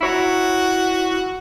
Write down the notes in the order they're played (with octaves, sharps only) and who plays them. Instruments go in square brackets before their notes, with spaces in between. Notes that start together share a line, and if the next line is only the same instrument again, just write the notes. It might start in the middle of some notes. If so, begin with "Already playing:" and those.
[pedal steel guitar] E4 C#5 A#5 [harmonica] F#4